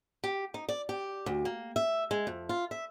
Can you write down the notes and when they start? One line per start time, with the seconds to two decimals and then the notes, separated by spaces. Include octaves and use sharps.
0.24 G4
0.54 D#4
0.69 D5
0.89 G4
1.26 D2
1.45 A#3
1.76 E5
2.11 G#3
2.27 F2
2.49 F4
2.71 E5